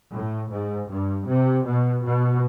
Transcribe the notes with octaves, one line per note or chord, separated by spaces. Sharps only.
A2
G#2
G2
C3
B2
B2